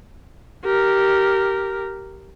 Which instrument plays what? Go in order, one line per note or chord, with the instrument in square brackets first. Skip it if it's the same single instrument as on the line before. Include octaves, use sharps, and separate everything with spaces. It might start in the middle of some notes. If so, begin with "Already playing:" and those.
[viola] G4 A#4